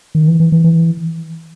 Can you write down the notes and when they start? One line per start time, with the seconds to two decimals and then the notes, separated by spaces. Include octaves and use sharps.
0.15 D#3
0.28 E3
0.40 E3
0.52 E3
0.64 E3